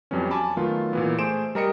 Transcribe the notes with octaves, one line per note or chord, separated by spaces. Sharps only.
F2 F#3 G3 B3 C#4
G#5 A5 B5 D6
D#3 F#3 A3 B3 F4
A#2 E3 B3
A3 G#4 C5 D7 E7
G3 A#4 D#5 C#7